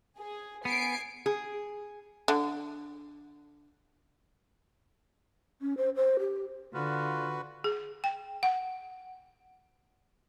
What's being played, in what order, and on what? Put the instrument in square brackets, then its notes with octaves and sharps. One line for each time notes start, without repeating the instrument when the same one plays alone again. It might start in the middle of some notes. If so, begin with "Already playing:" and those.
[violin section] G#4
[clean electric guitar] B3 [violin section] G#5 C7 D7
[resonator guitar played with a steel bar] G#4
[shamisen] D3
[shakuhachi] C#4
C5
C5
G4
[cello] D3 [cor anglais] F4 [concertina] F#4 B4
[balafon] G#4
G5
F#5